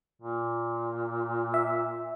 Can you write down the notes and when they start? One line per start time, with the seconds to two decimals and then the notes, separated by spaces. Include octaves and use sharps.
0.22 A#2
1.54 E5